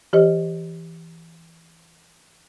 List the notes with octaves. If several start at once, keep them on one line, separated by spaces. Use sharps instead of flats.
E3 G4 C5 D#5